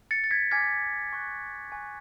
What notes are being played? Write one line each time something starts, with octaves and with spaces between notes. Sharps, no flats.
A6 C#7
A6
G#6 B6
G#5 D6 F6 G#6 B6
G#5 C#6 F#6
G#5 C#6 F#6